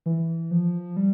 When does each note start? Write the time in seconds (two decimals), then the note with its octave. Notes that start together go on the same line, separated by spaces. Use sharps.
0.06 E3
0.51 F3
0.97 G3